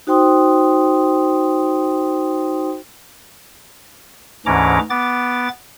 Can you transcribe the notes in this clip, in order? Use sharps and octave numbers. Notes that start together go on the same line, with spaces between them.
D#4 F#4 C5 G5 C6 D#6
D2 G#2 E3 C#4 A#5 D6
B3 D6 A6